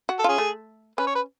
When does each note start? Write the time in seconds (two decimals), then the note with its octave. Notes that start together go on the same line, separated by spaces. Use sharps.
0.09 F#4
0.19 A4
0.24 C#4 F4 G#4
0.38 A3
0.98 C#4 B4
1.07 C#5
1.15 B4